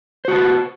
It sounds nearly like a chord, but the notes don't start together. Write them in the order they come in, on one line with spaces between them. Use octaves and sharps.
C5 F#4 A5 B4